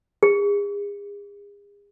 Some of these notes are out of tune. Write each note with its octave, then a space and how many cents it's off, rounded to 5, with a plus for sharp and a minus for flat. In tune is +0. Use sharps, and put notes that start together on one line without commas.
G#4 -40